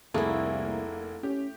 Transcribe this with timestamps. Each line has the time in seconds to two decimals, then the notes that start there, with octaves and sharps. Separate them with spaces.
0.14 F1 C2 A3 A#3 E4 G#4
1.23 C#4 G4